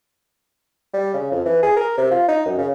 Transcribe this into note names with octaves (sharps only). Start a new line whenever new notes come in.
G3
C#3
F2
E3
G#4
A#4
C3
F4
D#4
F#2
C#3